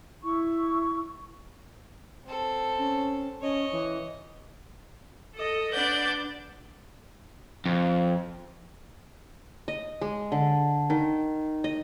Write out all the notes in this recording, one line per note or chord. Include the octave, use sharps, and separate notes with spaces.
E4 C#6
C4 A4
C#4
C#4 C#5 D#5
E3
A4 D#5
D4 B4 D5 F#5 G6
F2
D#5
G#3
D3
D#3
D#5